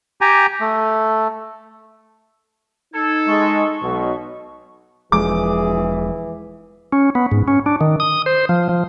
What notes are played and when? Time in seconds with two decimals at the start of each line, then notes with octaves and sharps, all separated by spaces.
0.21 G4 G5 G#5 A#5
0.61 A3
2.94 D#4 A4 G#6
3.27 G#3 C#6
3.82 B1 B2
5.12 E1 E3 F3 G#3 G#4 D6
6.92 C#4
7.15 B3
7.31 G#2
7.48 C#4
7.66 D4
7.81 D#3
8.00 D#6
8.26 C5
8.49 F3
8.69 F3